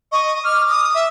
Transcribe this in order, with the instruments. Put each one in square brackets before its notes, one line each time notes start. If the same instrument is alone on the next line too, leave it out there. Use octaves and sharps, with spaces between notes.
[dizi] D#5 [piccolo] C#6
[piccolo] D6 [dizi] F6
[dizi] D#6
E5